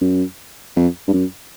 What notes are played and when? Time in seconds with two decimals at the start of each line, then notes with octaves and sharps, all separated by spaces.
0.01 F#2
0.76 F2
1.07 G2
1.13 F#2